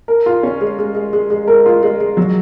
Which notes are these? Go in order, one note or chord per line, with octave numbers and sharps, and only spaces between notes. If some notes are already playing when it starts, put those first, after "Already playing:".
A#4
F4
C#4
G#3
G#3
G#3
G#3
G#3
A#4
F4
G#3
G#3
F#3